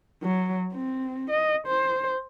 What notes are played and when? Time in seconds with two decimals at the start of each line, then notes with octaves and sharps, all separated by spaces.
0.23 F#3
0.73 C4
1.30 D#5
1.67 C5